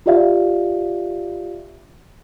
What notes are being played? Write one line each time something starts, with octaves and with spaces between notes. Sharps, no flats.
F4 G4 D5 E5 F5